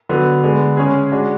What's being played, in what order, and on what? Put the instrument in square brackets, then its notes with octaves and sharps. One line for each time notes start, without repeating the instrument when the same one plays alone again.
[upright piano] D3 F#3 B3
D3 G#3 B3
C#3 G#3 C#4 G#4
G#3 D4 F#4